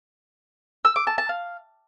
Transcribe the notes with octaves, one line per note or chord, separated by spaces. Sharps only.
E6
D6
A5
A5
F5